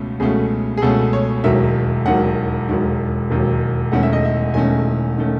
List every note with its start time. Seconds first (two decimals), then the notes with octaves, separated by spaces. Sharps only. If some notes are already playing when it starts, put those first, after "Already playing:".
Already playing: C#2 B2 A3 C#4
0.20 C#2 B2 A3 C#4 G#4
0.78 G#4
0.82 C#2 B2 A3 C#4 A4
1.13 C#5
1.44 E1 D#2 D#3 F#3 E5
2.06 E1 D#2 D#3 F#3 F#5
2.68 E1 D#2 D#3 F#3
3.30 E1 D#2 D#3 F#3
3.92 E1 E2 D#3 A3 C#4 F#5
4.03 E5
4.13 D#5
4.25 E5
4.54 E1 E2 D#3 A3 C#4 G#5
5.18 D#3 A3 C#4